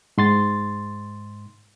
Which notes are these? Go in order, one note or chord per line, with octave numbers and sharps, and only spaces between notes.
G#2 C6 A6